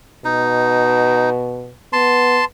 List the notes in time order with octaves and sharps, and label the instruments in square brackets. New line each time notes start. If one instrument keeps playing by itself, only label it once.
[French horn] B2 [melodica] D#4
[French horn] B3 [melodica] A5 C6